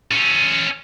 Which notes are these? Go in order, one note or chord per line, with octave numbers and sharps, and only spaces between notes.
C#4 A4